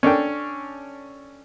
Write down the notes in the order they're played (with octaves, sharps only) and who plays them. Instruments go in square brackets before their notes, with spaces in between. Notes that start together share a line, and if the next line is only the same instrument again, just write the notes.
[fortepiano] C#4 D4 A4 G5